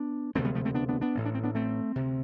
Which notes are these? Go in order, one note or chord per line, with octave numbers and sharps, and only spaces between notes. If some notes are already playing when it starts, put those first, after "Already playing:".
Already playing: B3 D4
E1 D2 C3 A3 C4
G3 B3
F3 A3
A3 C4
B3 D4
B3 D4
B3 D4
A1 A2
D4
C4
B3 D4
A3 C4
D2 C3